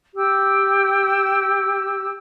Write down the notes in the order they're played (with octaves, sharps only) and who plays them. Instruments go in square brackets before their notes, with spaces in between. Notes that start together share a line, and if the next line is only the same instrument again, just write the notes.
[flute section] G4 E6